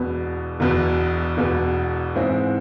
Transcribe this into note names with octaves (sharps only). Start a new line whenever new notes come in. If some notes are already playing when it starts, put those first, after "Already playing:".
Already playing: E1 E2 B2 B3
E1 E2 B2 B3
E1 E2 B2 B3
G#2 E3 G#3 C4 E4